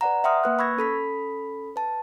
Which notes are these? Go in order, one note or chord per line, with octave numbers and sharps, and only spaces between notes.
B4 D5 F#5 A#5
E5 F#5 G5 C6 D#6 F6
A#3 B4 F#6
B5 C#6 E6 G#6 A#6
C#4 A4 B5 B6
B4 A5